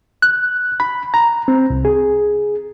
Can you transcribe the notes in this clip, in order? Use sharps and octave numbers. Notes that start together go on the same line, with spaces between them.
F#6
B5
A#5
C4
C2
G#4